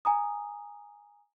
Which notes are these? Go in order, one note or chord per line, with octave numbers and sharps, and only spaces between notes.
G#5 A#5 D#6